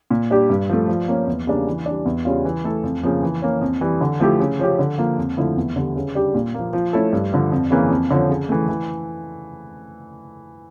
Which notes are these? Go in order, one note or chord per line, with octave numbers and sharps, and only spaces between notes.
A#2
G3 D4 G4
G2
F3 A3
F3
A#3 C#4
E2
C#3 G3 A#3 D4
E3
G3 D4
E2
C#3 G3 C#4 F4
E3
A3 E4 A4
F2
C#3 F3 A#3
E3
A#3 C#4
F2
E3 G3
D3
F3 A3 E4 G4
C#3
F3 C#4 G4
D3
F3 A#3
F2
D3 F3 A3 E4
E2
D3 G3
C#3
G3 D4 G4
A#2
F3 A#3
F3
A3 C#4 E4 A4
G2
D3 F3
F2
C#3 E3 A#3
F2
D3 F3 C#4
C#3
E3 A3
E3